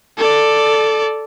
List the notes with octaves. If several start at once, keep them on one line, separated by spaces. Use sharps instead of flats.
A4 D5